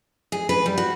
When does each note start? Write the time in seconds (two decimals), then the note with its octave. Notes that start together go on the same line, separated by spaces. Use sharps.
0.32 G#4
0.49 B4
0.66 G3
0.78 F#4